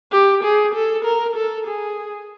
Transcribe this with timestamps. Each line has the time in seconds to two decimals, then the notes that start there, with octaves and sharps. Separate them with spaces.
0.12 G4
0.43 G#4
0.74 A4
1.05 A#4
1.36 A4
1.67 G#4